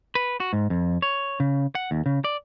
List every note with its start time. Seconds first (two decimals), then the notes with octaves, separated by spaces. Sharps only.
0.15 B4
0.40 F#4
0.53 G#2
0.70 F2
1.02 C#5
1.40 C#3
1.75 F#5
1.91 D#2
2.06 C#3
2.24 D5